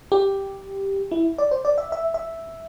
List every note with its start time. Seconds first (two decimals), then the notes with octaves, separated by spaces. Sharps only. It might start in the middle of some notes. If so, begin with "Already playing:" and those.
0.12 G4
1.11 E4
1.38 D5
1.51 C5
1.65 D5
1.78 E5
1.92 E5
2.14 E5